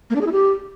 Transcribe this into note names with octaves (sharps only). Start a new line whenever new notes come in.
A#3
D4
G#4
E4
G4